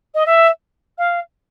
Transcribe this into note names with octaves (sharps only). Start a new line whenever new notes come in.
D#5
E5
F5